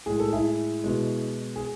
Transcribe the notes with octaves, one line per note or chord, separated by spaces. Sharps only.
A2 G#3 G#4
A4
E4 G#4
B2 G#3
G#4